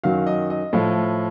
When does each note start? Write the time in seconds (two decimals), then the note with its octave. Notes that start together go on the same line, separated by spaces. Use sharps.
0.04 F#2 D#3 F#3 F5
0.27 D#5
0.50 D#5
0.73 A2 F3 F5